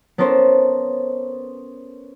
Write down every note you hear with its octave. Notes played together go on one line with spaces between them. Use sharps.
B3 C#4 A4 A#4 C5